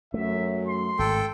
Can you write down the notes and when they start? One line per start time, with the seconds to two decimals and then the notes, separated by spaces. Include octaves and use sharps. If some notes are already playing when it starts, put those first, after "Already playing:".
0.14 F#2 A3 E5
0.67 C6
0.99 G#1 A4 G5